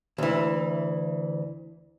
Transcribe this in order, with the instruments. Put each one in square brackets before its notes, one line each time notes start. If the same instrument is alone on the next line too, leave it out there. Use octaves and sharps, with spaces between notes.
[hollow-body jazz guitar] D2 E3